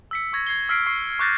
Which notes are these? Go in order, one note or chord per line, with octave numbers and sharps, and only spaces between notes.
E6 B6 C#7
C#6 G#6 A#6
G#6 C7 G7
E6 F6 B6 C7 D7
C#6 E6 C7
C#6 D6 F#6 G6 A6 A#6